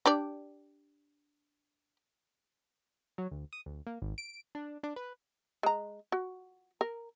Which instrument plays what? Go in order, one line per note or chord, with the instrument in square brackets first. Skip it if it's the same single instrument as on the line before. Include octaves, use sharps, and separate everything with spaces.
[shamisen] D4 G4 D5
[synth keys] F#3
D2
D#6
D2
A#3
G#1
D7
D4
D4
B4
[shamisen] G#3 A#5
F#4
A#4